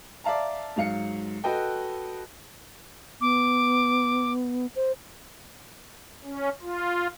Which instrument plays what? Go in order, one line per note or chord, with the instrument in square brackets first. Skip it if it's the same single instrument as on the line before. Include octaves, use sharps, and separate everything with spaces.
[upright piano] D5 E5 F5 A5 A#5
G#2 F#3 F5 C#7
F#4 A4 B4 D#5 G5
[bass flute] B3 [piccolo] D6
[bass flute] C5
[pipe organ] C#4
F4